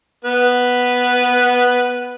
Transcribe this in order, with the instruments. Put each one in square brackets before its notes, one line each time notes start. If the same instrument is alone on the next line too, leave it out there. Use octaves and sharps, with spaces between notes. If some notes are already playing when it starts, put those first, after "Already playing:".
[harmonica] B3 B4